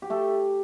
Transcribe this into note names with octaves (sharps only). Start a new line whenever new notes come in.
G4
A3 A4